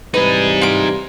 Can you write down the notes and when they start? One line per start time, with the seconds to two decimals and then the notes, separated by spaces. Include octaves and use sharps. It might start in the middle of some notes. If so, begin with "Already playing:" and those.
0.14 C3 E3 G3 D#4 G#4 B4
0.62 F4 D6